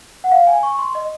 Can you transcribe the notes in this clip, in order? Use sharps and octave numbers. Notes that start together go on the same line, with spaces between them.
F#5
F5
G#5
C#6
C6
D#5